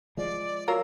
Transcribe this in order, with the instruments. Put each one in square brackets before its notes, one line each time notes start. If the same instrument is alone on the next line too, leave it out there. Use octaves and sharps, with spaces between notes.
[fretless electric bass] F3 G#3 [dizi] D5
[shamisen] F#3 F4 A#4 [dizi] E6